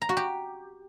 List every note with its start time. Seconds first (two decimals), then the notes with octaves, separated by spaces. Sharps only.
0.02 A#5
0.09 F#4
0.17 G4